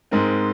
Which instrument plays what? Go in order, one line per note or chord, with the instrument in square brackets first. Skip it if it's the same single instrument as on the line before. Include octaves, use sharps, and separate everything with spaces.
[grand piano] G#2 G#3 C4 A#4